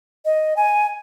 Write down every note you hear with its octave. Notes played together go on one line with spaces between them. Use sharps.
D#5
G#5